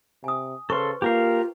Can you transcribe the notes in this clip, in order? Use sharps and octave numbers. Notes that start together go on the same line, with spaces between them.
C3 G#5 D#6
C#3 A4 B4 C5 C6 C#6
A#3 F4 G4 A#4 F5